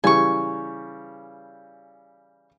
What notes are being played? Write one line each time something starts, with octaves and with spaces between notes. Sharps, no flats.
C#3 E3 G3 G#5 C#6